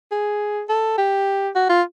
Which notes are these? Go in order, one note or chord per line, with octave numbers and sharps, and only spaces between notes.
G#4
A4
G4
F#4
F4